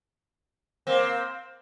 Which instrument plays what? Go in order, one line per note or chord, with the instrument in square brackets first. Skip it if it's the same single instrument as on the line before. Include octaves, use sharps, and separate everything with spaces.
[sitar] A#3 C4